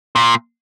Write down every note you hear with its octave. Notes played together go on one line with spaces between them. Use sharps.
A#2